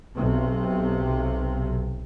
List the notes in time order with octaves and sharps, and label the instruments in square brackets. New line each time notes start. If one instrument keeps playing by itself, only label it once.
[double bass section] B1 C3